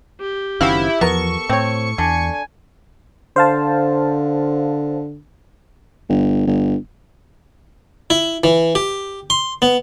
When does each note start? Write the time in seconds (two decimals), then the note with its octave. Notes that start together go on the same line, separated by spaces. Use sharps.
0.21 G4
0.61 F#1 D#3 C4 C#4 E4 F#4 F5
1.01 E2 F3 B3 A4 A#4 C#6
1.49 A2 C4 C#5
1.98 E2 D3 G#5
3.36 D3 C5 F5 A5
6.09 G1
6.47 G1
8.10 E4
8.44 E3
8.75 G4
9.30 C6
9.62 B3